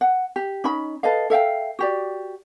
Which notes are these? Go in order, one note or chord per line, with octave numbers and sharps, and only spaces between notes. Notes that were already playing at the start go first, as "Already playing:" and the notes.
F#5
G4
C#4 D#4 B5
A4 B4 D#5 F5
A4 E5 F5 G5
F#4 G4 D5